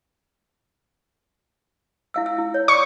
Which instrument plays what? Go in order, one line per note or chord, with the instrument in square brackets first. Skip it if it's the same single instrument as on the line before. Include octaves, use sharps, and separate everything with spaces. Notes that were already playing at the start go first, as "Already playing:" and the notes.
[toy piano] E4 F5 E6
E6
E4
C#5
[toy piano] D5 B5 D6 [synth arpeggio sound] C#6